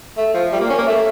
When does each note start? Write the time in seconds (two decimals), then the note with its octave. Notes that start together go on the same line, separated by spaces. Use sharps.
0.17 A3
0.34 F3
0.52 G3
0.61 A#3
0.70 C#4
0.78 A#3
0.87 A3